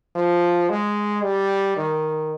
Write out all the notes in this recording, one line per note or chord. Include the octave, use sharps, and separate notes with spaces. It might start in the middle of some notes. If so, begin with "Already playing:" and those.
F3
G#3
G3
D#3